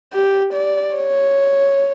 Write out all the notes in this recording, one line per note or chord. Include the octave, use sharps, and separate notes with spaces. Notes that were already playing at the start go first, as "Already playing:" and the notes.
G4
D5
C#5